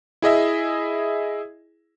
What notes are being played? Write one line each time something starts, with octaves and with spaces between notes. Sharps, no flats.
E4 G#4 D#5 E5